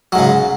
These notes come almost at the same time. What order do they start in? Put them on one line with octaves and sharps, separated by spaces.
F#3 G#2 C#3